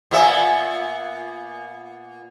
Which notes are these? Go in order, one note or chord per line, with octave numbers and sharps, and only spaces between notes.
A#2 B3 E5